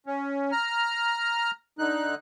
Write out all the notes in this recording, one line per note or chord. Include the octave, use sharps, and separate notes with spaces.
C#4
A#5 F6
D3 D#4 F#6